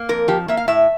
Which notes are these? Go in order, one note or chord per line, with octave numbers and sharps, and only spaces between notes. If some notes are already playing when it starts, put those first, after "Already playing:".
Already playing: A#3
F2 A#4
F3 G4
A#3 E5
F5
A2 E5